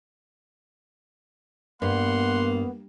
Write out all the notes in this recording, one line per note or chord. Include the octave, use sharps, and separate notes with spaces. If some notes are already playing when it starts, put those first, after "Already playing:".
G2 A#3 B3 F#5 C6